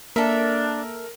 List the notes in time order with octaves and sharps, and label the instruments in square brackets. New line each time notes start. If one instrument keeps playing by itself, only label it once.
[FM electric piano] A#3 [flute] D4 [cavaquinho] A4 E5 [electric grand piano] A#4